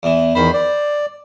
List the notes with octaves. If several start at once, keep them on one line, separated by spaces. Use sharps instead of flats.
E2 E3
E2 D#3 C5 B5
D5